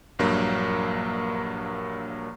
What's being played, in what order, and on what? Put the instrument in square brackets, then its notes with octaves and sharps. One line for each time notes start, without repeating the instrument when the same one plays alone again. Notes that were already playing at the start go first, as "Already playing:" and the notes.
[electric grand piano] A#1 G2 F#3 A#3